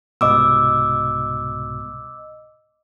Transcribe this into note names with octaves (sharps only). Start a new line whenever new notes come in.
C2 G#2 B2 D#5 D6 E6